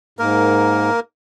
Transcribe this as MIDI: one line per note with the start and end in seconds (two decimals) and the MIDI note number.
0.19 0.90 44
0.19 1.00 58
0.19 1.00 70